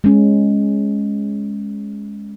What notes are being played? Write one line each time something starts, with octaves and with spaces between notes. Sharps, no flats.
G#3 C#4